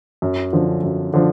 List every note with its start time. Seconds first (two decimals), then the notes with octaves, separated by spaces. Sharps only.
0.22 F#2
0.53 D3 F3
0.83 F#2
1.13 D3 F3